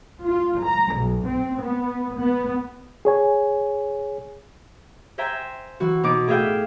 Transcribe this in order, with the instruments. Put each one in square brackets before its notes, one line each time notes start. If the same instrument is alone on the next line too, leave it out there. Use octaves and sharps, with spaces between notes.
[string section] F4
A#5
B1
C4
B3
B3
[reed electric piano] G#4 C#5 G#5
[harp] C5 E5 G5 G#5 A#5
E3 F#4
B2 D#4 D6
A2 G#4 E5 F5 G5